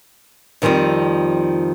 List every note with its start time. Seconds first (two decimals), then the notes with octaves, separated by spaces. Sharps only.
0.62 F2 D#3 F3 G3 C4